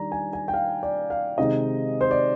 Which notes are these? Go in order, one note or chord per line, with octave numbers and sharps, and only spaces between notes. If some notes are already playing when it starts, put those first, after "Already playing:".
Already playing: D#3 G3 D4 D5 A#5
G#5
G#5
G5
F5
D5
F5
C3 D#3 G#3 D#4 D#5
C5
D5